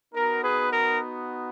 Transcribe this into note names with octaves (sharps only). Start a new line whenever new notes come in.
B3 D#4 F#4 A#4
G#4 B4
A#4